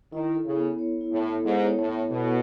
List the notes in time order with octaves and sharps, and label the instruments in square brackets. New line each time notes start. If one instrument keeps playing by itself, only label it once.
[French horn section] D#3 [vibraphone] E4
[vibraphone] A4
[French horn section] C#3
[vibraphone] B3
C#5
E4
[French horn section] A2
[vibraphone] A4
[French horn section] G#2 [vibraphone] B3
[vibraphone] C#5
[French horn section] A2
[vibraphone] E4
[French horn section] B2 [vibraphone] A4